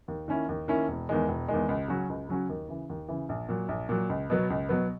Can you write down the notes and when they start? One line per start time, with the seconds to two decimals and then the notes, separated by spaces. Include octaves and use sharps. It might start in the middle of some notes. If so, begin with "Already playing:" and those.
0.08 D#2
0.28 D#3 A#3 C#4 E4
0.49 D#2
0.68 D#3 A#3 C#4 E4
0.88 E1
1.09 E2 D#3 G#3
1.28 E1
1.48 E2 D#3 G#3
1.69 C#2
1.88 C#3 F#3 C#4 F#4
2.09 C#2
2.29 C#3 F#3 C#4 F#4
2.49 D#2
2.69 C#3 E3
2.90 D#2
3.08 C#3 E3
3.29 A#1
3.49 A#2 F#3
3.69 A#1
3.89 A#2 F#3
4.09 C#2
4.30 B2 F#3 B3
4.50 C#2
4.69 B2 F#3 B3